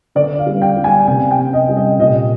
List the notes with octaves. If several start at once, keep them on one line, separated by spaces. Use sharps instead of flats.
D3 D5
F5
G3
G5
G3
G#5
C3 G#5
G5
C3
D#5
G3
D#5
A#2 D#5